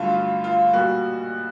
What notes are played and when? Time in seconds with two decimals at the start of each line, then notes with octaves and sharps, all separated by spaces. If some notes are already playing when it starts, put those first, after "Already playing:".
Already playing: G2 D3 F#3 A3 F4
0.14 F4
0.44 F4
0.73 B1 A#2 G3 A#3 F#4